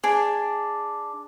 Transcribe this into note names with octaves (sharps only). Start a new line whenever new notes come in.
D4 G#4